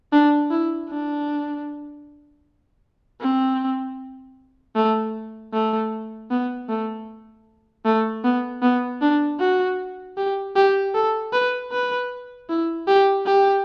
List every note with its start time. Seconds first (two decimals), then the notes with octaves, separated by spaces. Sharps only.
0.12 D4
0.51 E4
0.90 D4
3.21 C4
4.76 A3
5.53 A3
6.31 B3
6.69 A3
7.85 A3
8.24 B3
8.62 B3
9.02 D4
9.40 F#4
10.17 G4
10.56 G4
10.95 A4
11.33 B4
11.72 B4
12.49 E4
12.88 G4
13.26 G4